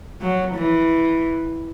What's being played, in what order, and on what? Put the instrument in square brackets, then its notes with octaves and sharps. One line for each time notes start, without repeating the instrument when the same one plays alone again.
[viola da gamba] F#3
E3